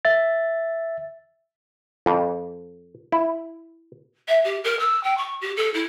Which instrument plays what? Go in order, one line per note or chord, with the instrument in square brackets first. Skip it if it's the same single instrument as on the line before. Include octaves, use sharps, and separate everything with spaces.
[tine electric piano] E5 A6
[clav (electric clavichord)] F2
E4
[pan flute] E5
G4
A#4
E6
G5
C#6
G4
A4
E4